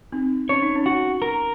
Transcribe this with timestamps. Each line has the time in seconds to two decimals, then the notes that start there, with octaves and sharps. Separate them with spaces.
0.12 C4 D#4
0.49 C#4 C#5
0.62 D#4
0.76 C#4
0.86 F#4
1.22 A#4